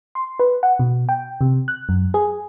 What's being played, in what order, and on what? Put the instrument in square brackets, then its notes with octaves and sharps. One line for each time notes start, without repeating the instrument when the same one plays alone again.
[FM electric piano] C6
B4
F#5
B2
G5
C3
F#6
F#2
G#4